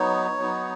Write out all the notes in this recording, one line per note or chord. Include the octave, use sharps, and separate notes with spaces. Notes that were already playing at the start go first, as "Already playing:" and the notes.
Already playing: F#3 B3 D#4 C#5
F#3 B3 D#4